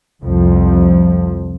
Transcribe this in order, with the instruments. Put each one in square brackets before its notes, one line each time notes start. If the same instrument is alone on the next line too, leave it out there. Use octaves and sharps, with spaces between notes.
[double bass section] C2 F2 F3